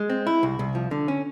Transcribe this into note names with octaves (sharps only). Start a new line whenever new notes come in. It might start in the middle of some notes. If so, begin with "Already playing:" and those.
Already playing: G#3
C4
E4
C2
C2
F3
D3
C#4